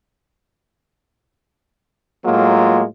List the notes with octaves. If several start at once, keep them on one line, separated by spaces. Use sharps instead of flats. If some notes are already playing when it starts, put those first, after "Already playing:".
A2 F#3 G#3 A#3 F4